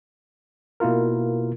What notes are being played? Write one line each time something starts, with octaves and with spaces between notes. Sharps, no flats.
B2 A#3 E4 F4 A#4